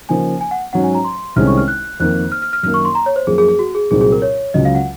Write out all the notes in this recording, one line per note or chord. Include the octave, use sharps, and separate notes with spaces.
C#3 F3 A#3 D#4 G#5
G#5
F#5
G#2 F#3 C#4 F#5
G#5
A#5
C6
C2 C3 D#3 G#3 C#4 F6
C#6
F6
F#6
F2 D#3 A#3 F#6
F6
F6
F6
F#2 D#3 A#3 F6
C#6
C6
A#5
C#5
C5
F#2 F3 A#3 G#4
G#4
G#4
F#4
G#4
C2 A#2 F#3 C4 D#4 G#4
G#4
A#4
C#5
C#2 C#3 F#3 D#5
F5
F#5